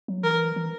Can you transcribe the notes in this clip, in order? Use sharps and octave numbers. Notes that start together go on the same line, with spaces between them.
F#3
E3 A#4
E3